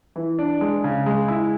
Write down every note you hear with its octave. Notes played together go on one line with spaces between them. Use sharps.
E3
D4
G#3
C#3
G#3
E4